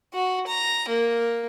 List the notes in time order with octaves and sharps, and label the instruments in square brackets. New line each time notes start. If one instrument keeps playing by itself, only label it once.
[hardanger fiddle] F#4
A#5
A#3